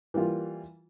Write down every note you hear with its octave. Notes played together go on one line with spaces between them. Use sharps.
E3 G3 A#3 F4